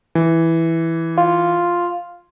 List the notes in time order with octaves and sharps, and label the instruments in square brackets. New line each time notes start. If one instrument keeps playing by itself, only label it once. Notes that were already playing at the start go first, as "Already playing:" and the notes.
[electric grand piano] E3
[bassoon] F4